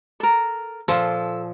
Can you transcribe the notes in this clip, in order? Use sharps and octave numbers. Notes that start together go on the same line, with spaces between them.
A4 A#4
A#2 F3 A4